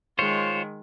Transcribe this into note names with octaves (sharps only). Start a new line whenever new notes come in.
D#3 G#3 F4 C5 C#5